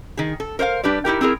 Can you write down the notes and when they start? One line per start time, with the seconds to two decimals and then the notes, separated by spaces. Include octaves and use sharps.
0.17 D#3 G#4
0.40 A4
0.59 A#4 C5 D5 F5
0.83 G3 D4 G4 B4 D5
1.05 D#4 E4 G4 A#4
1.21 C4 E4 G#4 A#4